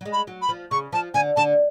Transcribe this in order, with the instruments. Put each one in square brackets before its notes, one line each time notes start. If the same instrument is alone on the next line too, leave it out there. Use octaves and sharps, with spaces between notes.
[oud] F#3
G#3
[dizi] B5
[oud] F#3
[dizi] B5
[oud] F3
[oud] C#3 [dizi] C#6
[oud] F3 [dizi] A5
[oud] D3 [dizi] G#5
[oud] D3 [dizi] A5